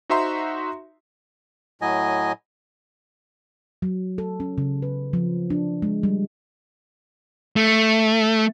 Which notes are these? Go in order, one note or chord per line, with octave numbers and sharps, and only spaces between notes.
D#4 F#4 C5 E5 A#5 C6
A2 F#3 D#5 G#5
F#3
A4
C#4
C#3
B4
F3
D4
G#3
G3
A3